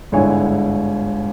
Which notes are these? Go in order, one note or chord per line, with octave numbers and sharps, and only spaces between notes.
G1 G#2 D3 E4 C#5 G#5